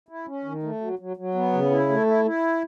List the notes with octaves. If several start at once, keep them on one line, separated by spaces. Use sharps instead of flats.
E4
C#4
D#3
A3
F#3
F#3
F#3
B3
C#3
E4
A3
E4
E4